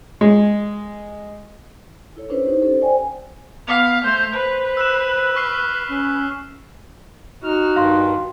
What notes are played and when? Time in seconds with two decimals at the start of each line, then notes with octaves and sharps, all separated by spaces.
0.21 G#3
2.16 E4 A4 C#5
2.30 C#4 D4 E4 B4 C5
2.46 D#4 G4 C5
2.62 C#4 G4 A4 C5
2.81 C5 D5 G5 G#5
3.68 B3 F5 B6 F7
4.04 A3 C5
4.33 B4 C5
4.77 E6 F#6 E7
5.36 C#6 F6 C7
5.89 C#4
7.44 D#4 F#4 F6
7.76 G2 D#3 F5 C6